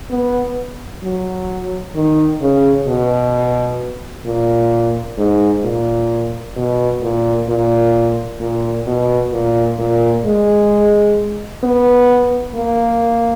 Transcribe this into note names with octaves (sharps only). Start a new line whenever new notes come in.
B3
F#3
D#3
C#3
B2
A#2
G#2
A#2
B2
A#2
A#2
A#2
B2
A#2
A#2
G#3
B3
A#3